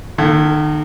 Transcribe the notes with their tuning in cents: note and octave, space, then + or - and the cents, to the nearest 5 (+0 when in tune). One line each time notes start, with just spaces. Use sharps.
D#3 -35 A#3 +0 A4 +0